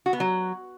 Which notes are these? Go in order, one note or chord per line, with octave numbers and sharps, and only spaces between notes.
F#4
B3
F#3